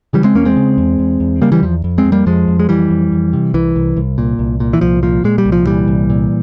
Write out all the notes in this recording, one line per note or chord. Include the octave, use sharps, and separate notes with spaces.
C#3 E3 G3
G#3 C4
E2 A#3 C#4
G#3 C4
C#3
E2
E2
E2
C#3 G3 A#3
E3 G3
E2 F3
F2
G#3 C4
F2
G3 A#3
F2 F3 G#3
F2
G#3
F2 E3 G3
F2
F2
C3
C2 E3
C2
C2
A#2
C2
A#2
E3
C2 F3
A#2 F3
A#2 G#3
G3
C2
F3
A#2 E3 G3
C2
A#2